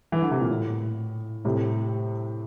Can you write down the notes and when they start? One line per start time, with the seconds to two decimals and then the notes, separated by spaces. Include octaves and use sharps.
0.12 E3
0.22 D3
0.31 C3
0.41 A#2
0.50 A2
1.45 A2 C3